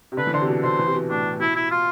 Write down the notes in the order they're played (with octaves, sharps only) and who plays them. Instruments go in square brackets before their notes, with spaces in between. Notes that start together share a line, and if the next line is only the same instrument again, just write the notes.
[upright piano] C3
[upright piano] D3 [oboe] B4
[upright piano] E3
[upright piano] D3 [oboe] C5
[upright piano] C3
B2
[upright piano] D3 [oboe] C5
[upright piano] E3
C3
B2
[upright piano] A2 [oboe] D4
[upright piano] B2 [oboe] E4
[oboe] E4
F4